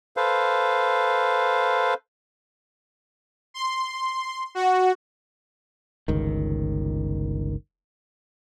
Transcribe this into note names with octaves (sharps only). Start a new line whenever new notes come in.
A4 B4 C5 F5
C6
F#4
G1 C#2 D#3